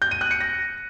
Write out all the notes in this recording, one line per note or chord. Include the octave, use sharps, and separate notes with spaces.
G6
D#7
F#6
C#7
A#6